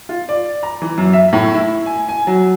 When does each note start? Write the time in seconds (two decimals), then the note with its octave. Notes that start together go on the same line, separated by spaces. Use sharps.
0.09 F4
0.29 D5
0.63 A#5
0.82 E3
0.98 F#2
1.13 E5
1.33 A2
1.54 E4
1.86 G#5
2.09 G#5
2.27 F#3